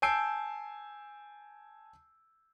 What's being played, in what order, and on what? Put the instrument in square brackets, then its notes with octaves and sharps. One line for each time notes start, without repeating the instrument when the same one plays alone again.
[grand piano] G#5 A5 E6 G6 C7 D7